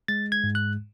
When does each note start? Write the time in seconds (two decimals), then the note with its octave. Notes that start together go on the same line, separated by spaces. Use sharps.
0.08 G#3 A6
0.32 G#6
0.44 G#2
0.55 F#6